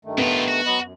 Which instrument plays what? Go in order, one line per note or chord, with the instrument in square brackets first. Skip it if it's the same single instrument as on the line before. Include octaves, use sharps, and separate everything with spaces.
[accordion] G2 D#3 A3
[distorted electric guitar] A2 F4 [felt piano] B3
[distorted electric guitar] F#4
[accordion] F#3 B4 D#5
F#2